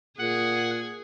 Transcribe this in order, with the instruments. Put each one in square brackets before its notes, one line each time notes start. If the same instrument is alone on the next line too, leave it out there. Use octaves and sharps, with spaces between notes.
[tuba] A#2 [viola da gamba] G#4 [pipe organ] F#5